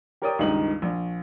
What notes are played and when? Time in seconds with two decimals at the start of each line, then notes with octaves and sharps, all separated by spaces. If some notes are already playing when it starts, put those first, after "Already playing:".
0.22 G4 A#4 C#5 D5 G5 D#6
0.39 C#2 G2 D#3 D#4 G4 F#7
0.82 A#1